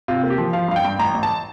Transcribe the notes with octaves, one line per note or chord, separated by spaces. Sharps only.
C3 F4
A#3
G4
F3
F3 F5
G2 F5
G5
G2
A1 A#5
A1
A5